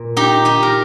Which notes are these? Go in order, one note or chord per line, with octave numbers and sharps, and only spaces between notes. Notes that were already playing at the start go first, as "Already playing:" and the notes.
Already playing: A#2
D#4 G4
D#4 G4
A#4